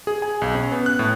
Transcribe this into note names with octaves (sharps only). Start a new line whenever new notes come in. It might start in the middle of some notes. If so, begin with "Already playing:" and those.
G#4
G#5
B1
C#4
B3
F#6
A2